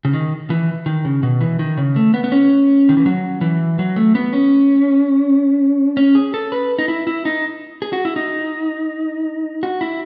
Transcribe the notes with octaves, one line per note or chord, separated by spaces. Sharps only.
C#3
D#3
E3
D#3
C#3
B2
E3
D#3
C#3
A3
B3
B3
C#4
D#3
E3
F#3
E3
F#3
A3
B3
C#4
C#4
G#4
A4
B4
D#4
E4
E4
D#4
G#4
F#4
E4
D#4
F#4
E4